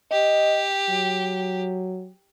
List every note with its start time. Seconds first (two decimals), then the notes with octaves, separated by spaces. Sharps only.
0.11 G4 D#5
0.89 F#3